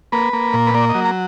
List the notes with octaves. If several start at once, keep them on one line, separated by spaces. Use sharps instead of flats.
A#3 B4
A#3
A#2
B4
A#3 D5
D#5
F#3
A#5